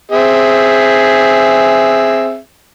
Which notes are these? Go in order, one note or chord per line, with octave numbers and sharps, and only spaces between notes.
C4 G#4 E5